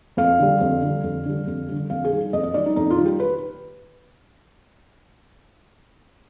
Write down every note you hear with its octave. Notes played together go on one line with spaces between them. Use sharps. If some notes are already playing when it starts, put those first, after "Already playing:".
F2 F5
D3 G3
F2
D3 G3
F2
D3 G3
F2
D3 G3
F2 F5
G#4
D#3 G3
F2 D#5
D#5
D#3 G3 D5
D#4
F2 D#4
F4
D#3 G3
G4
B4